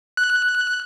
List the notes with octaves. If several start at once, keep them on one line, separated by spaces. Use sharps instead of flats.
F#6